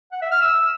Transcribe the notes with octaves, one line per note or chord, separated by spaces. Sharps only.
F#5
E5
F6
E6